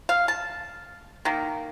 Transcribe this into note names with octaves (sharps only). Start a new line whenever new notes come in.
F5
A5
D#3 A#3